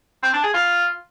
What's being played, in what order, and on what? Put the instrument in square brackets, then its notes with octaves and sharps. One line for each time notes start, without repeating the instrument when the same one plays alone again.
[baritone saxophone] C4
D4
G#4
F4